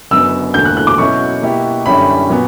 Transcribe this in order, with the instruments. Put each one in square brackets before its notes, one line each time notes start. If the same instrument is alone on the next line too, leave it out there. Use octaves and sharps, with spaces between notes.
[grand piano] F#1 F#2 D3 F#3 B3 [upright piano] E6
[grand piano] E1 D2 D3 A#3 [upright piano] G6
[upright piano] F#6
F#6
D6
[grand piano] B2 F#3 C#4 E4 [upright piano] C#6
[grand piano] B2 A#3 E4 G4
[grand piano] F#2 D3 G3 C#4 E4 [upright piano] B5
[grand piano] A#2 F#3 B3